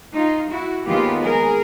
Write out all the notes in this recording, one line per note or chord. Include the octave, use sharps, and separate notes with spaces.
D#4 F4
E4 F#4
D#2 D#3 G#3 B3 F4 G4
G#4 A#4